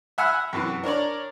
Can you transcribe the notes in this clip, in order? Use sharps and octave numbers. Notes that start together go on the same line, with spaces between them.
E5 F#5 G#5 B5 F6
F#2 C3 E3
D4 A#4 C#5 D5